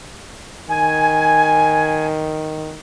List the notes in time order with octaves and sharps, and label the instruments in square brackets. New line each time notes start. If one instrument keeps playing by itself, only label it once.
[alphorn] D#3 [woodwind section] G#5